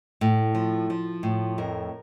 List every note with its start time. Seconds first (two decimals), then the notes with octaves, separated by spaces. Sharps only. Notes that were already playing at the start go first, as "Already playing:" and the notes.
0.21 A2
0.55 F3
0.90 F3
1.23 A2
1.58 F2 A#4